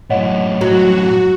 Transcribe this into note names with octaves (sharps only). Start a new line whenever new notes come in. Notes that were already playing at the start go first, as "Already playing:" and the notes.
F#2 A2 C#5 D#5 F#5
F#3 F#4